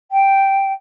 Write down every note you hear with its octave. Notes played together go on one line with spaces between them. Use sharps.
G5